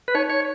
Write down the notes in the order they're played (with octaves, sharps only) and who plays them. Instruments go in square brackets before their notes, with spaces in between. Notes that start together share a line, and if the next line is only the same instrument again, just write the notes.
[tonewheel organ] B4
[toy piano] D#4 [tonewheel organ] C#5
[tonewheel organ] C#5